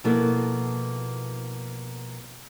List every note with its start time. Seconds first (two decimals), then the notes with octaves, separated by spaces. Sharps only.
0.04 B2 F3 A#3 B3 E4 A4